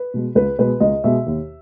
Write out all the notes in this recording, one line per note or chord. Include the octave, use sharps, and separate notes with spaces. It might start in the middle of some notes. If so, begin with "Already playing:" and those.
Already playing: B4
B2 G#3
C#2 B4
B2 G#3 B4
C#2 D#5
B2 G#3 E5
D#2